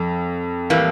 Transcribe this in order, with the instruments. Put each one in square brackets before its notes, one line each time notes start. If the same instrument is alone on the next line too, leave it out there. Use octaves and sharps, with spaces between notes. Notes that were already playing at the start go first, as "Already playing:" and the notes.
Already playing: [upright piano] F2
[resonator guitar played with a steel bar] A2 E3 G3 A#3